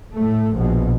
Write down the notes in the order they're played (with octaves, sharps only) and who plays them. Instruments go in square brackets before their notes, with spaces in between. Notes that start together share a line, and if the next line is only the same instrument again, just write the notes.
[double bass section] A2 A3
A#1 B2